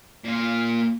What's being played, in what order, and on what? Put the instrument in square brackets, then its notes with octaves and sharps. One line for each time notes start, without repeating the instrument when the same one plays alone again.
[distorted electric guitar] A#2 F4